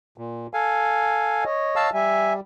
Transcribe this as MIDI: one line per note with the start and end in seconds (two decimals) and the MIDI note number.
0.18 0.47 46
0.54 1.44 69
0.54 1.44 77
0.54 1.44 80
1.44 1.88 73
1.44 1.88 75
1.76 1.90 77
1.76 1.90 81
1.76 1.90 88
1.94 2.40 55
1.94 2.33 76
1.94 2.33 80